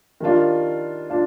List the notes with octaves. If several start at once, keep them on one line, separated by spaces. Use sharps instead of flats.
D#3 G3 D4 F4
D4 F4